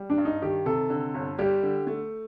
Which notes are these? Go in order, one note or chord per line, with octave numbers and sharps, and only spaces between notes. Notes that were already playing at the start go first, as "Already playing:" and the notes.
Already playing: G3
D4
G2
D#4
D#3 G4
C3 A4
D3
G1
G3 G4
D3
A3